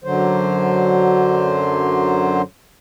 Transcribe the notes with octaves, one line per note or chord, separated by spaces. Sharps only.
F#2 D3 F#3 C5